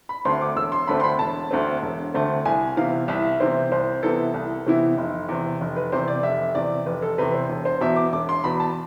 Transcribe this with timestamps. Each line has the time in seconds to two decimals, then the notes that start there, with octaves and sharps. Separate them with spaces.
0.09 B5
0.25 D2 D3 A3 C4 C6
0.41 D6
0.56 E1 E6
0.72 C6
0.87 D2 D3 A3 C4 B5
1.00 C6
1.04 B5
1.19 E1 A5
1.51 D2 D3 A3 C4
1.82 E1
2.14 D2 D3 A3 C4
2.45 C2 G#5
2.77 C3 E3 B3 E4 F5
3.08 C2 E5
3.40 C3 E3 B3 E4 C5
3.72 C2 C5
4.03 C3 E3 B3 E4 A4
4.34 C2
4.66 C3 E3 B3 E4
4.98 F1
5.28 E2 C3
5.61 F1
5.76 B4
5.92 E2 C3 C5
6.08 D5
6.23 F1 E5
6.54 E2 C3 D5
6.86 F1 B4
7.02 A4
7.18 E2 C3 B4
7.34 C5
7.49 E1
7.65 C5
7.81 E2 B2 E5
7.96 D6
8.12 E1 D6
8.29 C6
8.44 E2 B2 B5
8.60 A5